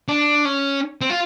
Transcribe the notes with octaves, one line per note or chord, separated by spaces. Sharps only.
D4
C#4
C4
F4